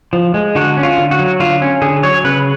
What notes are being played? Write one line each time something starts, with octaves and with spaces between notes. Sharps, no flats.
F3
G#3
D3 F#4
C#4
F4
D3
F#4
F#3
D3 F4
C#4
D3 G#4
F#3 C#5
C#3 B4